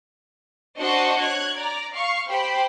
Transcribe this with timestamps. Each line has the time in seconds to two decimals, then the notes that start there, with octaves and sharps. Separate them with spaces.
0.79 D4 F#4 C5 D#5 A5 C#6
1.20 C#5 F#6 G#6
1.56 D5 A#5
1.94 F5 C#6
2.28 G4 C5 G5 B5